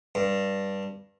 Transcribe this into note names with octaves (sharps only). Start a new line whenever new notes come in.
G2